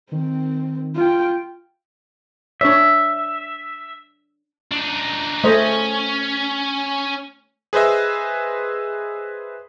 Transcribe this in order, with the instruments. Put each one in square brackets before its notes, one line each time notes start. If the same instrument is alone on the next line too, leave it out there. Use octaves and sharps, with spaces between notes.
[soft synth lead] D#3 [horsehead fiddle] C4
[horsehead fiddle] F4 G5
[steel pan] D4 C#5 D5 [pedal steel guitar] E5
[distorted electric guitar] D4 D#4
[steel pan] A3 C5 D#5 [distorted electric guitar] C#4
[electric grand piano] G#4 B4 C5 D#5 E5